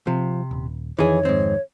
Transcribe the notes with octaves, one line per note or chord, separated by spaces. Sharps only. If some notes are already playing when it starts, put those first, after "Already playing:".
C3 F3
D#1
F2 D#3 E3 G#4 C#5
G#2 C4